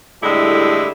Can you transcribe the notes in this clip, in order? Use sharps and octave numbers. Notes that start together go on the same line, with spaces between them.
A2 D3 G3 G#3 E4 G4